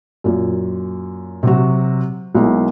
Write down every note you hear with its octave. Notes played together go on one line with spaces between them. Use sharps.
F#2 A#2
C3 F#3 F#4
B1 G#3 A#3 E4